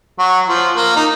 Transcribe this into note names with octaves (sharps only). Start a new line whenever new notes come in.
F#3
F3
A#3
D#4